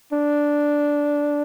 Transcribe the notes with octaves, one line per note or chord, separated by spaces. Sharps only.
D4